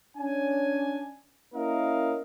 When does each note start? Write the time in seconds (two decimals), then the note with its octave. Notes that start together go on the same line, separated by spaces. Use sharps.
0.17 C#4 D4 G#5
1.54 A#3 C#4 E4 A#4 D#5 F5